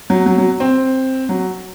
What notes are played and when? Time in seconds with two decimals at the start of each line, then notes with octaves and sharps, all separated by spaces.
0.10 F#3
0.26 F#3
0.38 F#3
0.60 C4
1.29 F#3